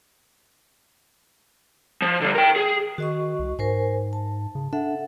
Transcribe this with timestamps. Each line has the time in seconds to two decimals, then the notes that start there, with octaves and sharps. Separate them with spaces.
2.02 F3
2.21 D3 G3
2.35 A#4 G5
2.56 G#4
2.98 D#3 F#4 D#5 C#6
3.39 C2
3.59 G#2 A#4 C5 G#5
4.13 A5
4.55 C#3
4.73 D4 A4 E5 F#5